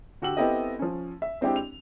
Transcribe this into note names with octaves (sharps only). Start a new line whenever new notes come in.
D3 F#4 G4 E6 F#7
B3 C4 E4 G4 A4 D#5
F3 C#4
E5
G#3 C4 D4 E4 G4
F7